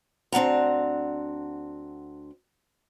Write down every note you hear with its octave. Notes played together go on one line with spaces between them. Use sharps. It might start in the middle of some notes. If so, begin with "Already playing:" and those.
D2 C4 D4 F#5 A#5